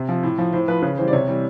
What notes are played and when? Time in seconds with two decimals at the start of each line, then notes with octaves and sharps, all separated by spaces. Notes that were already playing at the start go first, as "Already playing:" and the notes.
Already playing: C3
0.09 F3
0.23 A2
0.38 F3
0.53 A2 C5
0.68 F3 B4
0.82 C#3 B4
0.97 E3 G3 C5
1.08 D5
1.13 C3 C#5
1.28 E3 G3